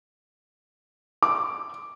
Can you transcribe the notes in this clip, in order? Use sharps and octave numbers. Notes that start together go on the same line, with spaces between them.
D6